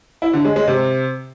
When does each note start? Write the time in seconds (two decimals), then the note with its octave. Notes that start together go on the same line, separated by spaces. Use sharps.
0.22 E4
0.33 D3
0.45 G#3
0.56 G#3
0.67 C3